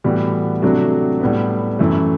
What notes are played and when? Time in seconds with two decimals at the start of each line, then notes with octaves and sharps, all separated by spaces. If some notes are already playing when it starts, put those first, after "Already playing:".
0.04 A2 E3 G3 B3 F#4
0.62 C3 F#3 A3 D4 F#4
1.20 A2 G3 B3
1.79 F#2 E3 A3